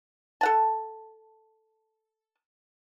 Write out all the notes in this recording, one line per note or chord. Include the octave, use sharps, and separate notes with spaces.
A4 F#5 A5